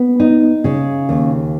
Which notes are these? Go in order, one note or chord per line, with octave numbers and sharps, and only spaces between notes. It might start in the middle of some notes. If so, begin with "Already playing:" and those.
Already playing: B3
D#4
C#3
D#2